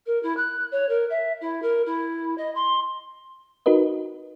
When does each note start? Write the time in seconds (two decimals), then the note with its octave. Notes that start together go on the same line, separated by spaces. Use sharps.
0.06 A#4
0.22 E4
0.36 F#6
0.71 C#5
0.88 A#4
1.09 E5
1.41 E4
1.62 A#4
1.85 E4
2.37 D#5
2.55 C6
3.66 D#4 F#4 A#4 B4 D#5